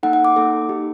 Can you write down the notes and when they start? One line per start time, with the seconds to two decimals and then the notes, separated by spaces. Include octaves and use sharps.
0.03 A#3 D#4 A4 F#5
0.13 F#5
0.25 D6
0.36 A#3 D#4 A4
0.69 A#3 D#4 G4